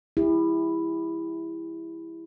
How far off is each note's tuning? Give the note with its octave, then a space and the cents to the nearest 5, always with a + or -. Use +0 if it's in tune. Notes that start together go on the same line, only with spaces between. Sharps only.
E4 +0 G4 +45